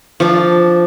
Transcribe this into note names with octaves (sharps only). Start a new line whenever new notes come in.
F3 D4